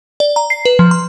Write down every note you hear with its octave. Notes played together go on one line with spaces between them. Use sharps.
D5
A#5
C7
B4
F3
C6